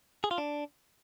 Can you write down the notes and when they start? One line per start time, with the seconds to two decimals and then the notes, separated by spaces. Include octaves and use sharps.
0.24 G#4
0.31 F4
0.38 D4